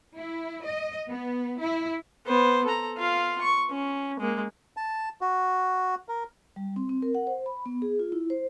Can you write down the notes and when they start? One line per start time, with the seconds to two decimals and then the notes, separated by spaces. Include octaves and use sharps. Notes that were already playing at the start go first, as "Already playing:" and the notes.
0.16 E4
0.64 D#5
1.09 B3
1.61 E4
2.26 B3 C5
2.65 A4 A#5
2.97 F4 F5
3.41 C#6
3.70 C#4
4.19 G#3 A#3
4.77 A5
5.21 F#4
6.08 A#4
6.56 G3
6.76 C4
6.89 C4
7.02 A#4
7.15 F#5
7.27 C5
7.46 B5
7.66 B3
7.82 G#4
7.99 F4
8.12 E4
8.30 C5